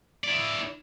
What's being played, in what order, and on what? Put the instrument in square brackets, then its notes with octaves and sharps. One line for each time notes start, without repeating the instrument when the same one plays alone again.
[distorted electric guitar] E4 D5